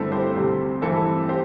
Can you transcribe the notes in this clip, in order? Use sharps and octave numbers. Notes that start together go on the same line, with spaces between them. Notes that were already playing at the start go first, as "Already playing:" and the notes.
Already playing: G2 D3 A3 C4 E4 A4
G4 C5
D2 C3 G3 C4
G2 E3 A3 C4 E4 A4
G4 C5